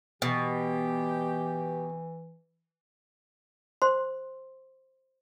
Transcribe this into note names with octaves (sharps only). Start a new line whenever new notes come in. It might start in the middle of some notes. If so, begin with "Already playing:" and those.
B2 E3 G4
C5 C6